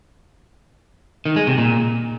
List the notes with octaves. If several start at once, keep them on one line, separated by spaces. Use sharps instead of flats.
D#3
G#3
C3
A#2